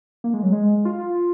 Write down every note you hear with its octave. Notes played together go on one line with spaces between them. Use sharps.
A#3
G#3
F#3
G#3
F4